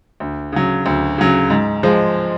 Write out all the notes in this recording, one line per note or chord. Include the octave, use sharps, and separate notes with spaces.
D2
C#3 F#3
D2
C#3 F#3
G#2
F3 G#3